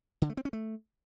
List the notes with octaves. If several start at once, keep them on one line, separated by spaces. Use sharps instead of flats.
D3
A3
C4
C#4
A3